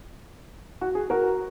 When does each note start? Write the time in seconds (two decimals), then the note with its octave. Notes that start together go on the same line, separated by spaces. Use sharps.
0.81 F#4
0.95 G#4
1.10 F#4 A#4